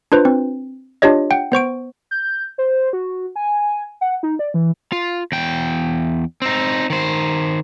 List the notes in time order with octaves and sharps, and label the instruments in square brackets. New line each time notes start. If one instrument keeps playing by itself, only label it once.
[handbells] D4 F4 B4 C5
C4
D4 F4 G4 C#5 D#5
F#5 G5
B3 C5 C#6 D7
[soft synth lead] G6
C5
F#4
G#5
F#5
D#4
D5
E3
[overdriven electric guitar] F4
E2 G5
C4 D#4
D#3 C5